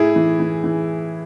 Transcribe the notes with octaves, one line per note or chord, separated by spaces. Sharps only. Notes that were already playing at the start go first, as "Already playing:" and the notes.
Already playing: A2 E4 G#4
E3
E3
E3